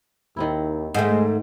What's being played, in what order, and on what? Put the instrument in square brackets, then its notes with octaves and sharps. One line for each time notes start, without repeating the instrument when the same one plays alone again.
[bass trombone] D#2 [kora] D#3 C4 E4
[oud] G#2 A3 [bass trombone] G#3 [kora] D#5 G5